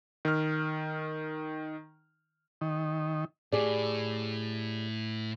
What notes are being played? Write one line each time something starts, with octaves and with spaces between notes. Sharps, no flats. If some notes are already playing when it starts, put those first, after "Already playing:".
D#3 F6
D#3
A2 G4 G#4 D5